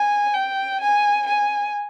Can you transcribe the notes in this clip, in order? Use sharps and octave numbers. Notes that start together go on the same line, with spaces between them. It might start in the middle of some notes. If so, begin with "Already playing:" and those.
Already playing: G#5
G5
G#5
G#5